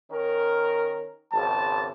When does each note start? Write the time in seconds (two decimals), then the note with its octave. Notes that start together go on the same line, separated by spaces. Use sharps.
0.10 D#3 C#4 A#4
1.33 G#1 C#2 A5